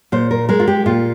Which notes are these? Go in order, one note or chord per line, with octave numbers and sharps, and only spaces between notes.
A#2 C5
A#4
G#3 A#4
F4
G4
A#2 F4